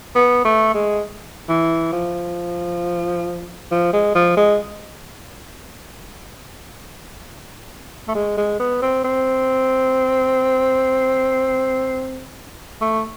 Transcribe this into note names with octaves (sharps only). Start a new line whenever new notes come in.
B3
A3
G#3
E3
F3
F3
G#3
F3
G#3
A3
G#3
G#3
B3
C4
C4
A3